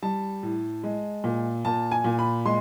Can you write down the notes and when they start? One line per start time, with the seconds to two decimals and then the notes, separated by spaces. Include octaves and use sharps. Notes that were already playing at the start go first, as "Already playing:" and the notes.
0.02 G3 A5
0.43 A2
0.84 G#3
1.24 A#2
1.65 A#2 A5
1.91 G#5
2.04 A#2
2.19 B5
2.45 G#3 C6